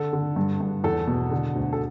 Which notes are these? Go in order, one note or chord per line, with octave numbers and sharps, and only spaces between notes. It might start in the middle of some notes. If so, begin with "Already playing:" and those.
Already playing: D3 A4
D3
G2
G2
E2 A4
B2
D3
D2
A4